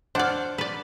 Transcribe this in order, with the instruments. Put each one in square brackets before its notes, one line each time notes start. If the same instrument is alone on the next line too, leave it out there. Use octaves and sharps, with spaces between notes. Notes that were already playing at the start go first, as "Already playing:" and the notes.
[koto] D4 D5 [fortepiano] C5 F#5 F6
[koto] B4 D5